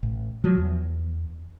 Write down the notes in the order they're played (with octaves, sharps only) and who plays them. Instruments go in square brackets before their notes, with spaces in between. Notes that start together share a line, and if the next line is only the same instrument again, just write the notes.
[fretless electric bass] A1
F3 F#3
E2